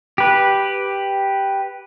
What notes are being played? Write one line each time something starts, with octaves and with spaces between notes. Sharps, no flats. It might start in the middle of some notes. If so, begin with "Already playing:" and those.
G4 B4